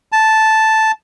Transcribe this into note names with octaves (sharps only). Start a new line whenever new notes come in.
A5